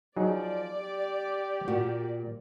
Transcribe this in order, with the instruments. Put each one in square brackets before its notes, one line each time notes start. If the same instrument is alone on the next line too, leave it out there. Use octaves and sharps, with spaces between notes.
[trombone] F3 [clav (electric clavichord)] F#3 D#4 G#4 [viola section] D5
[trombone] G4
[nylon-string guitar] A#2 [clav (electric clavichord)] F#4